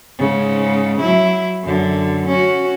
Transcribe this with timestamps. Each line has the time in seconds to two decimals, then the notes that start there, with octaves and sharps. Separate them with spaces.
0.18 G#2 C#3
1.00 F#3 E4
1.63 F#2 D3
2.27 C#4 F#4